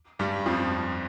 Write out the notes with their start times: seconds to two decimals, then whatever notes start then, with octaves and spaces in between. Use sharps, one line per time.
0.19 G2 G3
0.46 F2 F3